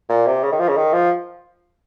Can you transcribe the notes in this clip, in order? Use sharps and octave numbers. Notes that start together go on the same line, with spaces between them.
A#2
C3
C#3
D#3
F3
C#3
D#3
F3